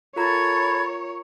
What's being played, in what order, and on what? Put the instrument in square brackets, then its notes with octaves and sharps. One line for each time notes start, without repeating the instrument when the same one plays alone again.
[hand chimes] F4 A#4 A#5 [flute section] A4 B5 G#6 [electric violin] C#5